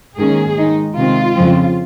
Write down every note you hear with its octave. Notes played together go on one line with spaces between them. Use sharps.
G#2 D#3 A#3 C#4 G#4
D#3 G#3 D#4
C3 D#3 G#3 C4 F4
F2 C#3 F3 C4